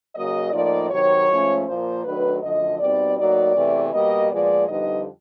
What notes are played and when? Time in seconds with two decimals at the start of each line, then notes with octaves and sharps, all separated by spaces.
0.15 C#3 F#3 A#3 D#5
0.52 A2 F3 A#3 D#4 D5
0.90 C3 D#3 F#3 C#5
1.28 G#2 F3 A3 C#4
1.66 A#2 F3 A#3 C5
2.04 D#3 F#3 A3 D4 B4
2.42 F#2 D3 F3 A3 D#5
2.80 B2 G3 C4 D#4 D5
3.18 A2 F#3 A#3 D#4 D5
3.55 E2 C3 E3 A3
3.93 B2 G3 A#3 D#5
4.31 A#2 F3 G#3 B3 D5
4.68 F2 D3 G3 B3 D#4 D#5